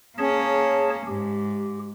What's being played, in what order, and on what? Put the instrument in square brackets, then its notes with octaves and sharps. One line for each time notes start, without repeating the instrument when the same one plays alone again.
[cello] A#3 C#4 [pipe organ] G#4 C#5 A5
[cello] G#2 [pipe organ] G4